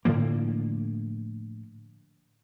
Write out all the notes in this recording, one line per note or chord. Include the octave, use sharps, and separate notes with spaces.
A2 D3 F3 A#3